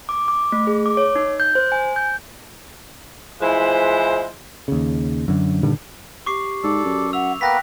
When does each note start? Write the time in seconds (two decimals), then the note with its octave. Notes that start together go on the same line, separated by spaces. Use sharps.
0.09 D6
0.28 D6
0.52 A3
0.67 G#4
0.86 D6
0.97 C#5
1.16 D#4
1.40 G6
1.55 C5
1.72 G#5
1.96 G6
3.40 E3 F3 G#3 E4 C5
4.68 D#2 C#3
5.28 F#2 D3
5.63 G2 A#2 D3 D#3
6.26 G4 C#6 D6 C7
6.63 G#2 A4 D5
6.85 F#2
7.13 E5 F#5 E6 F7
7.41 A#3 B3 B4 G5 F#6 A#6 B6